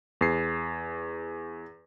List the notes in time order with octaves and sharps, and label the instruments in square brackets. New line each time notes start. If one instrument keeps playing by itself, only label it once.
[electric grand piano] E2 C7